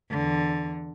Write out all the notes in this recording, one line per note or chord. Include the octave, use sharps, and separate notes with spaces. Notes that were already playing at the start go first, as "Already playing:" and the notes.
E2 D3